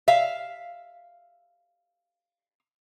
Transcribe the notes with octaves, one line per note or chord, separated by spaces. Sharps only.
E5 F5